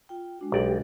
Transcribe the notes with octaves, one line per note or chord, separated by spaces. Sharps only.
F4 G5
G#3 D4 F#4
B1 G4 D5